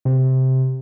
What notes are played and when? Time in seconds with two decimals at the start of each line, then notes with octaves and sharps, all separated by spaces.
0.05 C3